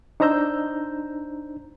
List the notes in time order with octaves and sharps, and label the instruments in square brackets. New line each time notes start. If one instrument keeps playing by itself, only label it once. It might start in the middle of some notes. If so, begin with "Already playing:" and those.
[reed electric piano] D4 D#4 C5 A#5 E6 G6